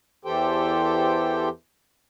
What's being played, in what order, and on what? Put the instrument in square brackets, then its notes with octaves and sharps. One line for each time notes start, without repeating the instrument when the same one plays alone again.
[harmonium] E2 E3 G4 A4 C5 G5